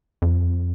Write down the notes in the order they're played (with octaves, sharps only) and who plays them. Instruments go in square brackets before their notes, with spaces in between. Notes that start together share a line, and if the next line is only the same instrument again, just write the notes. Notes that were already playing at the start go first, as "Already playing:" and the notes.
[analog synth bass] F2